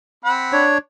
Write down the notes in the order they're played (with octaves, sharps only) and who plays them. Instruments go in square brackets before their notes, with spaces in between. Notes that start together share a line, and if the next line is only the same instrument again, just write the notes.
[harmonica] C4 F#5 B5
[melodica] D4 C#5